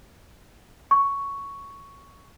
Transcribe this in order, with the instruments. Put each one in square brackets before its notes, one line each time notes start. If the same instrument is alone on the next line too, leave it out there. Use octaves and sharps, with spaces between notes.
[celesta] C#6